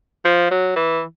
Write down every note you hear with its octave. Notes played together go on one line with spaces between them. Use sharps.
F3
F#3
E3